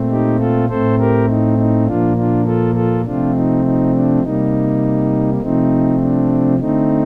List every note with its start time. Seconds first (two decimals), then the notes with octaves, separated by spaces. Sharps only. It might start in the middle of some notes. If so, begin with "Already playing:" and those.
Already playing: A#2 A3 C4
0.09 D#4 G4
0.39 F4 A4
0.68 A2 A3 C4 A4 C5
0.99 G4 A#4
1.28 D#4
1.58 D#4
1.87 A#2 F3 A#3 D4 F4
2.17 D4 F4
2.46 F4 A4
2.75 F4 A4
3.05 C3 F3 A3 C4 D4 F4
3.35 D#4
3.65 D#4
3.93 D4
4.23 C3 G3 A#3 D#4
5.41 C3 F3 A3 C4 D#4
6.01 D4
6.60 D3 A3 C4 D#4